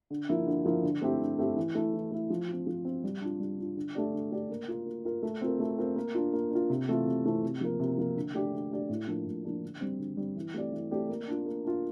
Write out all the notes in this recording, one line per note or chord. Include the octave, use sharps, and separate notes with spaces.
D3
F3 A#3 E4
D3
F3 A#3 E4
D3
A3 C4 E4 G4
D3
A3 C4 E4 G4
E3
A3 E4
E3
A3 E4
F3
C4 F4
F3
C4 F4
G3
D4 F4
G3
D4 F4
D3
A3 D4 G4 D5
D3
A3 D4 G4 D5
A#3
F4 A#4
A#3
F4 A#4
A3
C4 F4 A#4
A3
C4 F4 A#4
A#3
D4 F4
A#3
D4 F4
C3
E3 A3 C4 F4
C3
E3 A3 C4 F4
C3
F3 A#3
C3
F3 A#3
D3
A3 D4 G4 D5
D3
A3 D4 G4 D5
A2
F3 A#3 D4
A2
F3 A#3 D4
D3
G3 C4
D3
G3 C4
E3
A3 C4 G4 D5
E3
A3 C4 G4 D5
A#3
D4 F4
A#3
D4 F4